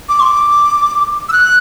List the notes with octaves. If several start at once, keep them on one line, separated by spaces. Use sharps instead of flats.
D6
C6
D6
E6
F#6